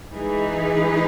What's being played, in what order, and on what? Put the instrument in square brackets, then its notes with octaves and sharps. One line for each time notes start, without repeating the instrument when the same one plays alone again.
[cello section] E3 G#3 D#4 G#4 B4